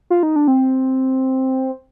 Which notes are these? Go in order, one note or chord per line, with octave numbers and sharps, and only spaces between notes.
F4
D#4
D4
C4